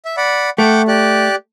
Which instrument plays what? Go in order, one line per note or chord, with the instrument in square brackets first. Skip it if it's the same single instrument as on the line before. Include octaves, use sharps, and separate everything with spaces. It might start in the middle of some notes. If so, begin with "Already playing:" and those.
[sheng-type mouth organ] E5
D5 F#5 B5
[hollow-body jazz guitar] A3 [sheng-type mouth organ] F#5 G5 D6
[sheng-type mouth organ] G4 D5 F#6